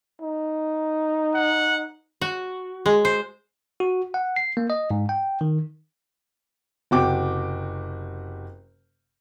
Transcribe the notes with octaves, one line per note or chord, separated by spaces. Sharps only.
D#4
F#5
F#4
G#3
C5
F#4
F#5
C7
A#3
D#5
G#2
G5
D#3
F#1 C3 F#4 G5 D6